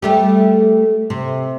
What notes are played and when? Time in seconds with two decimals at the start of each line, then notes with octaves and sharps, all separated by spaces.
0.02 G3 A3 G4
1.10 C3